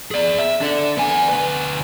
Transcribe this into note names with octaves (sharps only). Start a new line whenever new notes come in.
G#4 D5
E5
D4 A4
B3 G#5
D2 B4